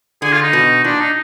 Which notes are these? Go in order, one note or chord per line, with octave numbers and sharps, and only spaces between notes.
D3 G#4
F4
D#4
B2
A#2 D4
D#4